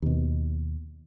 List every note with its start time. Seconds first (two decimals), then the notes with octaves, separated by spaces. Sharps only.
0.02 D#2 B2